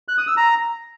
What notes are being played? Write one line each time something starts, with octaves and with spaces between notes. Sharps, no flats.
F#6
D#6
E6
A#5